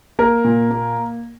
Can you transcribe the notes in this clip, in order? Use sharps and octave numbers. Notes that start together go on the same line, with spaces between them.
A#3 A#4
A#2
A#3